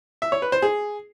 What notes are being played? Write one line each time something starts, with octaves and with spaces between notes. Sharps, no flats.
E5
C#5
B4
C5
G#4